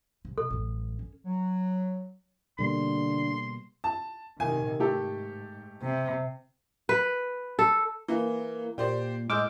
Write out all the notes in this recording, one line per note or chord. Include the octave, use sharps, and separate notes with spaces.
C2 A2
B2 A4
A1 F#2
C#4
F#3
B2 D3 G3 A#3 C6
A5
C3 D#3 G#5
G#2 A3 G4 A4
C3
B4
A4
E3 A#3
A#2 G4 C5 D5
A2 G#3 D6 E6 F6 G6